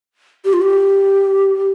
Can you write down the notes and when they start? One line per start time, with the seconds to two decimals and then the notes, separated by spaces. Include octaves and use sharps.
0.45 G4
0.53 F4
0.62 G4